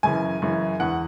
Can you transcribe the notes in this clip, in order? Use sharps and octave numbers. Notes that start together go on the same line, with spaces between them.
F#2 C#3 E3 G#5
F#2 C#3 E3
E2 E3 F#5